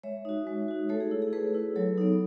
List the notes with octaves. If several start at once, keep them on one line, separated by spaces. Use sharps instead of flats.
G#3 C#5 E5
D#4 F#4
G#3
D#4 F#4
A3 A4 C#5
G#4
E4
G#4
A3 G#4 B4
E4
F#3 A4 C#5
B3 D#4